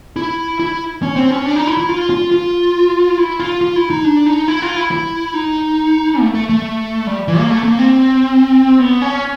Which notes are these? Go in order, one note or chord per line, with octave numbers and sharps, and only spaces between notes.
E4
E4
C#4
C4
C#4
D4
D#4
E4
E4
F4
F4
F4
E4
F4
F4
E4
D#4
D4
D#4
E4
F4
E4
E4
D#4
A3
A3
A3
G3
E3
A#3
A3
A#3
C4
B3
C#4